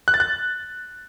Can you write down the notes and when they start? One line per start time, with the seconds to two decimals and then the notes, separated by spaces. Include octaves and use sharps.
0.08 F#6
0.14 A6
0.20 F#6